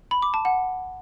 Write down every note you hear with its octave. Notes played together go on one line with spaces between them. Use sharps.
B5
D6
A5
F#5